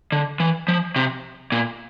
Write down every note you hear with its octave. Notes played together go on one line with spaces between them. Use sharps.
D3
E3
F3
C3
A#2